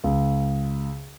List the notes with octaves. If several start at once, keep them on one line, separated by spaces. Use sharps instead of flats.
C#2